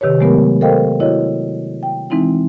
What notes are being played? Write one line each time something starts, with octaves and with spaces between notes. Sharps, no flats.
C3 D#3 G4 B4 C#5
F#3 G#3 A3 B3 G4 A#4
A4 A#4 C5 D#5 F5 G5
E4 F#4 C#5 D#5
G5
E3 G#3 C4 D#4 E4